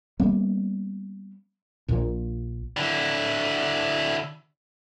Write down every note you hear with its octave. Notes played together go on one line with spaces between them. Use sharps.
G3 A#3 B3 C#4
A#1 A#2
D3 E4